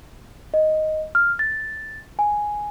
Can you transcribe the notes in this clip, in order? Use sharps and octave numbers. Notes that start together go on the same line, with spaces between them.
D#5
F6
A6
G#5